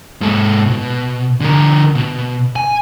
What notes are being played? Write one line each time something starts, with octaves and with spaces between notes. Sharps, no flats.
G#2 A4
B2
D3 A#4
B2
G#5